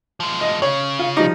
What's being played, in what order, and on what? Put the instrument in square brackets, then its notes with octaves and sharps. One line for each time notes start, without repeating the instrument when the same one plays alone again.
[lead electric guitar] F3 G#3
[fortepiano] D#5
[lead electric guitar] C#3 [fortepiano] C#5
[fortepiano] F4
F3 G3 D#4